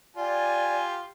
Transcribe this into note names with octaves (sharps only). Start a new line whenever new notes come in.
F4 G4 D5 G#5